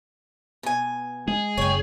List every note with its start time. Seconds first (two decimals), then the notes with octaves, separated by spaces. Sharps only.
0.63 B2 G#5
1.28 G#3 G#4
1.57 F#1 C#5 G5